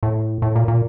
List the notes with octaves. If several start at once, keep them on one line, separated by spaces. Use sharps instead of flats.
A2
A2
A#2
A#2